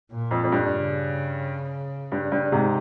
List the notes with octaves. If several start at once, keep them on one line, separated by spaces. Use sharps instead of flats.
A#2
F2
F2
G2
C#3
G2
G2
G#2 C3